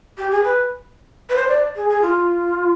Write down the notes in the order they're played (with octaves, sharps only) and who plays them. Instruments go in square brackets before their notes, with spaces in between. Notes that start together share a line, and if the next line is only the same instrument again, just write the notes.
[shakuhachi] G4
G#4
B4
B4
C5
D5
G#4
G#4
F4